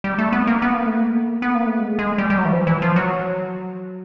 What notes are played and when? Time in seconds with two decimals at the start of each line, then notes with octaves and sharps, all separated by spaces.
0.04 G3
0.18 A3
0.33 B3
0.47 A#3
0.62 B3
0.74 A#3
0.87 A3
0.98 A#3
1.42 B3
1.55 A#3
1.67 A3
1.79 G#3
1.99 G#3
2.18 G3
2.30 G3
2.38 F#3
2.45 E3
2.52 F3
2.67 E3
2.82 F3
2.96 F#3